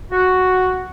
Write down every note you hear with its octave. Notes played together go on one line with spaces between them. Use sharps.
F#4